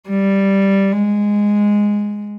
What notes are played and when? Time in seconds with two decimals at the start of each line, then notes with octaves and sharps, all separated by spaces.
0.09 G3
0.92 G#3